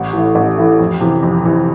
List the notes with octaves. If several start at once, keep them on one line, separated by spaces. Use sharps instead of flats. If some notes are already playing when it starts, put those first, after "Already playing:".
Already playing: A1
A2 E3
A1
A2 E3
F2
C3 E3
F2
C3 E3